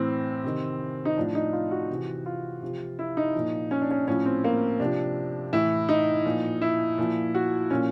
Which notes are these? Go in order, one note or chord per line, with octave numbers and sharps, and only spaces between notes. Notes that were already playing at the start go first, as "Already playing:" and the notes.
Already playing: A2 E3 C4
C3 D#3
D#4
A2 F3 D4
D#4
F4
F#4
C3 E3
F4
C3 F3
E4
D#4
A#2 F3
C#4
D4
C#4
A2 F3 C#4
C4
A#3
C3 F3 D4
A2 E3 E4
D#4
A#2 F3
E4
A#2 F3
F#4
A#2 F3 C#4